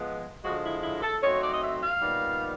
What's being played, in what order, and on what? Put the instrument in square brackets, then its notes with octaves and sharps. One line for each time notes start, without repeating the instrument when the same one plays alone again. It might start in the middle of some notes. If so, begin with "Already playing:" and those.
Already playing: [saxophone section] F3 G#3 B3
D3 F3 G#3 F#4
E4
E4
A4
F#3 A3 C4 D#4 C#5
D5
D#5
E5
F5
A#2 G3 B3 D#4